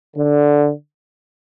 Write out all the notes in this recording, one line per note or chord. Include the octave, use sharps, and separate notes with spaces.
D3